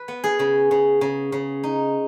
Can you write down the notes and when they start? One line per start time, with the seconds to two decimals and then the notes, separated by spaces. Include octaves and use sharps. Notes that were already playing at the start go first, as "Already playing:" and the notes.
Already playing: B4
0.08 B3
0.24 G#4
0.39 C#3
0.71 C#3
1.01 C#3
1.32 C#3
1.63 D#4